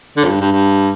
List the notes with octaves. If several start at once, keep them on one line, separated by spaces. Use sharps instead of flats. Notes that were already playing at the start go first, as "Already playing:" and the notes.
D3
F2
G2
G2
G2